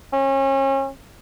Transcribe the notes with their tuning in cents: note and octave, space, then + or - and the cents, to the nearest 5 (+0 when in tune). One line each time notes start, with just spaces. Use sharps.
C#4 -35